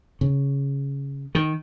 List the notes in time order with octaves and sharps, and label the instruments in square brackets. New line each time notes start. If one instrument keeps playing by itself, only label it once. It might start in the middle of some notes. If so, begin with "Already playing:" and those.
[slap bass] C#3
D#3